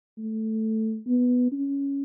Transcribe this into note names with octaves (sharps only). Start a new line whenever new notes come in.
A3
B3
C#4